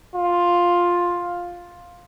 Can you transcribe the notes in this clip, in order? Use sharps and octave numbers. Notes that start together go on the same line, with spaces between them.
F4